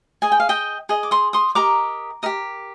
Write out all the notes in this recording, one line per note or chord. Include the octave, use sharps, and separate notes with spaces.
G#4 D#5 G#5
G5
F5
D#5 G5
G#4 D#5
D6
C6 D#6
C6 D#6
G4 A#4 D#5 A#5 D6
G4 A#4 D#5